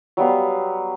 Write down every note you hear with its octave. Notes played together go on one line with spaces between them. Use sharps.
F#3 G3 B3 F5